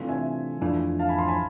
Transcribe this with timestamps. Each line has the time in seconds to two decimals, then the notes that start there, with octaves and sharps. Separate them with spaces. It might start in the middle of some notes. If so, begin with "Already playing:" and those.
Already playing: C3 E3 A3 D4 F4
0.09 E5 G#5
0.61 F2 E3 A3 D4 F4
0.99 F5 A5
1.09 G#5 B5
1.18 A5 C6
1.28 G#5 B5